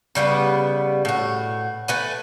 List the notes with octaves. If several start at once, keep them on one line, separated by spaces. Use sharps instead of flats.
C#3 G3 B3 B4
A2 F#4
A3 B4 G#5